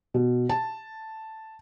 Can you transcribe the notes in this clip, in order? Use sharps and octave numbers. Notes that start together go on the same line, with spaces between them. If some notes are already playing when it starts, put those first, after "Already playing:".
B2
A5